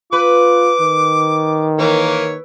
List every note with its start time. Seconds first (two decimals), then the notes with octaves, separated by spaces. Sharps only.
0.13 F4 B4 D6
0.81 D#3
1.79 E3 A#3 C#5